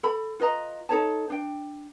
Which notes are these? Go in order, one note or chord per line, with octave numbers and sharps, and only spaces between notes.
A4 B5
F4 B4 D#5 A#5
D#4 A4 C#5 A5
D4 G5